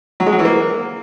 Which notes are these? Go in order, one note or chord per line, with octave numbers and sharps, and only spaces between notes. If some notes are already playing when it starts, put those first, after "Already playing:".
F#3
G#3
F#3
E3
A#3